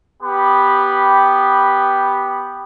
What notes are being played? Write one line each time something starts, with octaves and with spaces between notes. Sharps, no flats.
B3 G4 B5